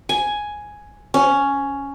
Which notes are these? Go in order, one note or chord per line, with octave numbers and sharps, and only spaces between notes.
G#5
C#4